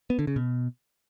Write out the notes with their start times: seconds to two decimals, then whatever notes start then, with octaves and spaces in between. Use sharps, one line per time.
0.10 B3
0.19 D3
0.27 C#3
0.36 B2